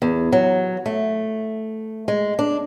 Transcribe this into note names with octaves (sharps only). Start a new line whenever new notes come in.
E2
F#3
A3
G#3
D4